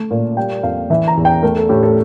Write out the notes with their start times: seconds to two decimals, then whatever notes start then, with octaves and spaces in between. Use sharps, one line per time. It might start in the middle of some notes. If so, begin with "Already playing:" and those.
Already playing: A3
0.11 A#2
0.37 G3 G5
0.63 F2 F5
0.90 E3 E5
1.08 A#5
1.17 E2
1.25 G5
1.43 A3 A#4
1.57 A4
1.69 A2 G4
1.83 A4